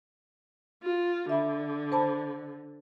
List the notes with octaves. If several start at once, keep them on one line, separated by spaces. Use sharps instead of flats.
F4
D3 E5 B5
C5 A5 B5